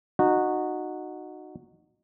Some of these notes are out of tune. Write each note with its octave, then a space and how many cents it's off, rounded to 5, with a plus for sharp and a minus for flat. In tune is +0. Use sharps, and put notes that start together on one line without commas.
D#4 -20 F#4 -10